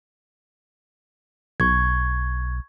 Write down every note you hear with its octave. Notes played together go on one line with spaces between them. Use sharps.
B1 C#6 G#6